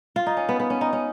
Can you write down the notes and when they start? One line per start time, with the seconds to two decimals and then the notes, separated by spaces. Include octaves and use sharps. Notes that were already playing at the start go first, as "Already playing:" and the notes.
0.16 F4
0.26 D#4
0.37 C#4
0.49 B3
0.60 B3
0.70 C#4
0.81 D#4
0.93 C#4